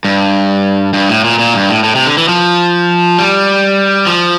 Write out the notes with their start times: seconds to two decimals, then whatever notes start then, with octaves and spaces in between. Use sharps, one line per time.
0.04 G2
0.94 G2
1.09 A2
1.24 A#2
1.39 A#2
1.54 G2
1.69 A2
1.84 A2
1.95 C3
2.06 D3
2.18 E3
2.29 F3
3.18 G3
4.07 F3